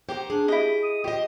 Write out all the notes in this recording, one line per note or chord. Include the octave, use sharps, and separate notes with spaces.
G4 C5 F#5 A#5
D4 G#4
E4 G4 D#5
D#6
F4 G4 C5 D#5